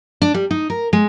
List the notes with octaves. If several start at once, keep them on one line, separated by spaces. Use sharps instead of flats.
D4
G3
D#4
A#4
G#3